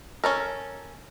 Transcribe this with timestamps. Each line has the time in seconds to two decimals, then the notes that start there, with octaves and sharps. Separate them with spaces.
0.24 C#4 A4 A#4